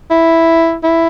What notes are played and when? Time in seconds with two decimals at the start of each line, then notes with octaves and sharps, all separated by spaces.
0.11 E4
0.84 E4